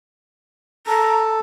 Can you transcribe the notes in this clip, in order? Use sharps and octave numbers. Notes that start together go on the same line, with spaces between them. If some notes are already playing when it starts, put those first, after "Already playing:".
A4 A#5